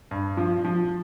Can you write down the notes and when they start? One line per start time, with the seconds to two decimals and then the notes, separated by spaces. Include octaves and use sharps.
0.11 G2
0.37 F3
0.65 F3